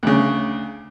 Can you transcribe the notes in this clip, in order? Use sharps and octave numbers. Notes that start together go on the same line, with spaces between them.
D2 C#3